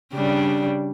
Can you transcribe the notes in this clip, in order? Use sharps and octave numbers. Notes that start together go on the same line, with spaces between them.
C#3 G3 D4